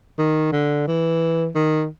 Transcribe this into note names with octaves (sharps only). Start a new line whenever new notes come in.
D#3
D3
E3
D#3